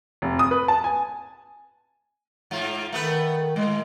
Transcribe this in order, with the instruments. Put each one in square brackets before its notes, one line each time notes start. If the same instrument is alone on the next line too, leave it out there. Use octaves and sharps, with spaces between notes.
[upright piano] F1
D#6
B4
A5
G#5
[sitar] G#2 F4
[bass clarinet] D#3 [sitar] A3 B3 B4
[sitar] A2 [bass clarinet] G#3